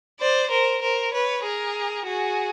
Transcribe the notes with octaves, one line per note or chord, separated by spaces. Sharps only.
C5 D5
A#4 C5
A#4 C5
B4 C#5
G#4 A#4
F#4 G#4